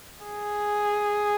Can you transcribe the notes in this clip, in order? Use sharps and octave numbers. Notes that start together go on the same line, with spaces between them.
G#4